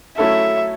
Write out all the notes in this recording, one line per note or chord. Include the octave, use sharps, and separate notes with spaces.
F#3 A3 C#4 E4 A4 E5